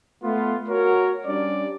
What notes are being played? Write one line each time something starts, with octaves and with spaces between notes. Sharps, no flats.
A3 B3 F4
F#4 A#4 C#5
G3 C#4 D4 D5